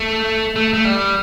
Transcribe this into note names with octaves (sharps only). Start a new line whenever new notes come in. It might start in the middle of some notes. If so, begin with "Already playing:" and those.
Already playing: A3
A3
A3
G3